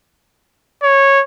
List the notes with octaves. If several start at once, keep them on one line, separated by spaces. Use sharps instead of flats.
C#5